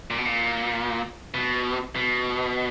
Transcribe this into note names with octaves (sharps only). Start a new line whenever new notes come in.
A#2
B2
A#2
B2
B2